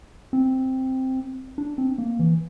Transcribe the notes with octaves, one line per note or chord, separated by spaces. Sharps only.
C4
D4
C4
A#3
E3